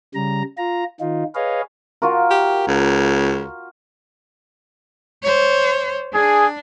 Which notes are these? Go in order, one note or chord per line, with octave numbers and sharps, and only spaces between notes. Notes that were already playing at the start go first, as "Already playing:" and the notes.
C#3 G3 A#5
F4 A#5
D#3 D#4 F4
G#4 B4 C#5 D#5 F5
F4 F#4 A#4
G4
C#2
C5 C#5
D4 G#4